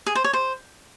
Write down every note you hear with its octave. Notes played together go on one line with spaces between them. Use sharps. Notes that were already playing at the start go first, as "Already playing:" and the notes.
G#4
C5
C#5
C5